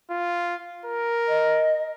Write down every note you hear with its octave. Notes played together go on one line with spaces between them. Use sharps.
F4
A#4
D#5